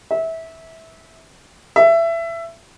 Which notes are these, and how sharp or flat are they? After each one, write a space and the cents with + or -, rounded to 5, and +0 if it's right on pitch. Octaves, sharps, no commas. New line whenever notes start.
E5 -20
E5 +20